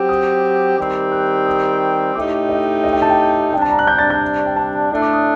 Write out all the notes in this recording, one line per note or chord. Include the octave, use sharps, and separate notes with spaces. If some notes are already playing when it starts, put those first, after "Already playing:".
Already playing: F#3 C4 G4
D#6
D#3 G3 C4 G4
F#6
D#6
A2 A3 D#4 G4 D6
D#5
D#5
G5
A5
G5
C3 G3 D4 G5
A5
A#5
F#6
G6
A6
G6
G5
A5
A2 A3 D4
D6
D#6